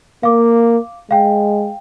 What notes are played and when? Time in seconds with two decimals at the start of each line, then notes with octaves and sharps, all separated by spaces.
0.23 A#3 F5 D6
1.11 G#3 F5 G5